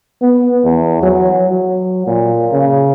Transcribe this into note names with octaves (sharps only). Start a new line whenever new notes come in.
B3
E2
F#3
F#3
A#2
C#3